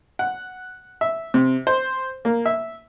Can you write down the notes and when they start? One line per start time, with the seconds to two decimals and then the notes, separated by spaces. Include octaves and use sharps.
0.19 F#5
1.01 E5
1.34 C3
1.67 C5
2.25 A#3
2.46 E5